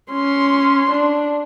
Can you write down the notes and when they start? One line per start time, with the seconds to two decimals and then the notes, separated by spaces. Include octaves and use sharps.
0.12 C#4 C6
0.91 D4